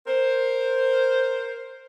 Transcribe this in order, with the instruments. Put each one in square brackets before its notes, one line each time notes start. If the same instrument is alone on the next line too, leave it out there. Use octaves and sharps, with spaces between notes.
[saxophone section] A#4 C5